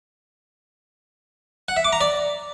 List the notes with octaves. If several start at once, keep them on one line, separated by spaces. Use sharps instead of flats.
F#5
E5
D6
A#5
D5